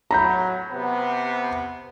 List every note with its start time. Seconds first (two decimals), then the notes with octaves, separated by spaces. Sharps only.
0.11 A2 F#3 A#5 B5 G6
0.71 C3 B3